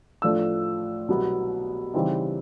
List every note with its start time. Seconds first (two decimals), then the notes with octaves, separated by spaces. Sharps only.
0.22 A2 F3 A3 D4 E6
1.08 C2 B2 F#3 B3
1.94 C#3 E3 G3 C4 D#4